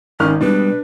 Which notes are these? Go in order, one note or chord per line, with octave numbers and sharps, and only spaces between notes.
G#1 D#3 C#4 F6
B2 G3 G#3 D4 B4